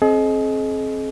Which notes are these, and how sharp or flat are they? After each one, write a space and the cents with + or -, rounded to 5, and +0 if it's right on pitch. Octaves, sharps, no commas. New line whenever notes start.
C4 +25 G#4 +40 D#5 +0